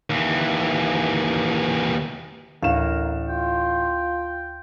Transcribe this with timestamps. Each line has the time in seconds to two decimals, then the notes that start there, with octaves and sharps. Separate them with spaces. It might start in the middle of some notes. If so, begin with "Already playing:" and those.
0.10 D#2 E3
2.63 A1 D2 A#4 F5 E7
3.29 F4 G5